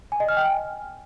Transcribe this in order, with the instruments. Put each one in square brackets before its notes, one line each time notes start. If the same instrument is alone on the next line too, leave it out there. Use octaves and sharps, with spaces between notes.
[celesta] G#5
D#5
F6
G5
G#5